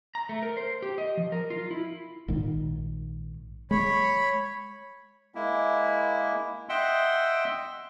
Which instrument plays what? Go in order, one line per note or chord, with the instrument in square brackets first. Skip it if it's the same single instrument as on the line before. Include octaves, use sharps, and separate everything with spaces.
[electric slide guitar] A#5
A3
A#4
C5
G4
D#5
F3
A#4
F4
E4
[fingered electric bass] A#1 G#2 D#3
[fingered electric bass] G#3 [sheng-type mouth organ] C#5 B5
[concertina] G#3 A#3 E4
D#5 E5 F#5 G5 C6 E6